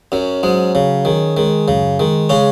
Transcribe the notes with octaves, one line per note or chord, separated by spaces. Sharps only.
F#2 F#3 C#4
G#2 F#3 G#3
C#3 C#4
D#3 G#4
D#3 G#3
F#2 C#3
D#3 G#3
C#3 G#3 C#4